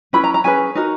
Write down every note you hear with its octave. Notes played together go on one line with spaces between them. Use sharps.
C#4 E4 B4 B5
A#5
A#5
C#4 G#4 B4 G#5
D#4 F#4 A#4